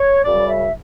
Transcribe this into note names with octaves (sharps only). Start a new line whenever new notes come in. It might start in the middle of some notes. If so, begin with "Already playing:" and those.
Already playing: C#5
F#2 C#3 G3 D5
E5